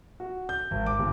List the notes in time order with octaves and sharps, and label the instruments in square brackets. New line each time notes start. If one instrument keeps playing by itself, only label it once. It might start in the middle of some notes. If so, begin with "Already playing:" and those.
[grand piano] F#4
G6
G#1
D6
G1